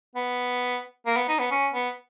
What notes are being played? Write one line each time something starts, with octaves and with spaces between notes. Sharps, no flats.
B3
A#3
B3
D#4
B3
C#4
B3